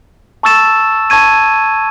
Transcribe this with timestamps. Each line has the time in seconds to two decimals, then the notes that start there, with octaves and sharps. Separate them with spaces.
0.43 A5 C#6 E6 A6 E7
1.10 A5 C#6 G#6 D#7